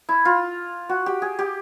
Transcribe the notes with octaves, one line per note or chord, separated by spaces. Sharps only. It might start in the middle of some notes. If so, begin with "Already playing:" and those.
E4
F4
F#4
G4
G#4
G4